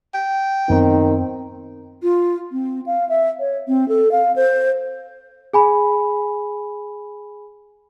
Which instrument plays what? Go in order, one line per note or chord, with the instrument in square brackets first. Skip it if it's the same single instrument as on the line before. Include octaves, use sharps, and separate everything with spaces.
[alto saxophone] G5
[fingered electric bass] F#2 B3 [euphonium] D#3 [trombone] C4
[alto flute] F4
C4
F5
E5
C#5
C4
A4
F5
C5
[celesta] G#4 G#5 B5